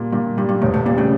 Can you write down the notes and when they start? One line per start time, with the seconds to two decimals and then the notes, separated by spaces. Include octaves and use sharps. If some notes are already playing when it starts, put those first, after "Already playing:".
Already playing: A#2 G3
0.12 G2 A#2
0.37 G2 G3
0.49 G2
0.62 E1 A2
0.74 A2
0.85 A#2 G3
0.98 A2 C#3